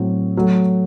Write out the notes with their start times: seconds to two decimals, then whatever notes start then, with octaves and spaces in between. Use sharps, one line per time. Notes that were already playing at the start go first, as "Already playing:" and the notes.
Already playing: A2 F#3 C4
0.37 F#3 A3